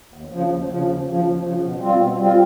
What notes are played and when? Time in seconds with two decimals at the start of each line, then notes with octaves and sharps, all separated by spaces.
0.14 D#2
0.32 C#3 F3
0.51 D#2
0.69 C#3 F3
0.88 D#2
1.07 C#3 F3
1.25 D#2
1.43 C#3 F3
1.62 B2
1.81 G3 C4 F4
1.99 B2
2.18 G3 C4 F4